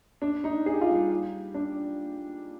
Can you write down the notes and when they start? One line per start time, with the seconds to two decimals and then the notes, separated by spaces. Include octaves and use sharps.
0.22 D4
0.44 D#4
0.66 G#4
0.74 G4
0.81 F4
0.89 G3 G4
1.54 D4